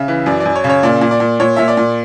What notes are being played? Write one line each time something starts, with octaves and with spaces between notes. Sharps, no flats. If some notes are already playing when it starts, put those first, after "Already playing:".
Already playing: C#3 E5
E3
F#2 D5
D5
F#2
C#5
C#3
C#5
A#2 D5
A#2
D5
A#2
A#2 C#5
A#2 E5
D5
A#2